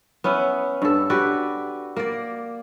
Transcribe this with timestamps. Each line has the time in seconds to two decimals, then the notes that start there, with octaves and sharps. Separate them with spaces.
0.24 B3 C#4 E4
0.82 G2 A4
1.10 F#4 G4 B4 D5
1.97 A#3 D5